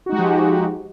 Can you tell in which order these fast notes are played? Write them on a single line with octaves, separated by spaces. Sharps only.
F#4 D#4 G#3 G4 F3